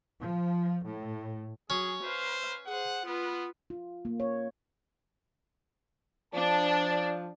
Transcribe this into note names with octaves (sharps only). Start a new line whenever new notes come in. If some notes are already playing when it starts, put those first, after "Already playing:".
F3
A2
F#3 C#4 G#4
B4 C5 F5
G#4 C5 F#5
B3 F4 B4
F4
A#3
C#5
F3 D4 A5